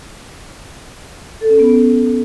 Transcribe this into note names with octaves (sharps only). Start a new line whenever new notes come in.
A4
C#4
B3